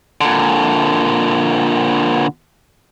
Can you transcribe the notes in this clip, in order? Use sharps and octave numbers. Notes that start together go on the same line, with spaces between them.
A#2 D3